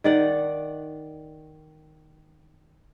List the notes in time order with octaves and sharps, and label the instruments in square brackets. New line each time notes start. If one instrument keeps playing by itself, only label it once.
[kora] D#3 D5 F#5